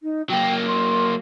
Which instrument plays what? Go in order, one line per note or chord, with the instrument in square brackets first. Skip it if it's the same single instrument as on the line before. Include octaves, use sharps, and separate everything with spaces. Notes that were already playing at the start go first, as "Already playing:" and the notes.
[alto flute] D#4
[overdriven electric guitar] F#3 A#3 [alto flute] G5
[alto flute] C6